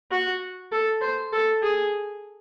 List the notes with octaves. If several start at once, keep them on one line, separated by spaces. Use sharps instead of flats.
F#4
A4
C5
A4
G#4